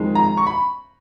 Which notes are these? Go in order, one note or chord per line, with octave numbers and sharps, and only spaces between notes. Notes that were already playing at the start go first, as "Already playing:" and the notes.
Already playing: F2 D#3 G#3
A#5
C#6
B5